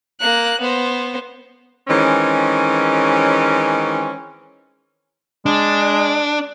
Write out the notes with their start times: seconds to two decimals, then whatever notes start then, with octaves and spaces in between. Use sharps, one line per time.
0.20 A#3 F#6
0.60 B3 C5
1.88 D#3 E3 G#3 C4 C#4
5.46 G#3 D4